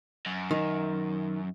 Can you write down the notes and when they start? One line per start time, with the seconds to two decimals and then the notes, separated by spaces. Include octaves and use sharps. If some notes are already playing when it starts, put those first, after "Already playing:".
0.26 F#2
0.51 D#3